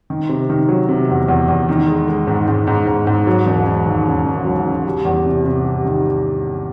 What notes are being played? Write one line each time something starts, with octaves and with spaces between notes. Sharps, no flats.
D#3
C3
D#3
F#3
C3
E2
E2
E2
D#3
G#3
G#3
G#2
G#2
G#2
G#2
G#2
F#3
E1
E1
D#2
C#3
E1
F#3
C#3
G3
E2
C3
C3
G3
D#3